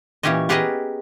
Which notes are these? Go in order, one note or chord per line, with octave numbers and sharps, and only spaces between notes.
A#2 E3 C#4 G4 C#5 D#5
B3 G4 G#4 A#4 B4 D#5